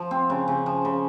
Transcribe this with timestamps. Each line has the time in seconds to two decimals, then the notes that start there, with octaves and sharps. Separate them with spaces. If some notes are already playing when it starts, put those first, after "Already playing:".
Already playing: F3
0.11 C4
0.30 C#3
0.48 C#3
0.66 F3
0.85 C#3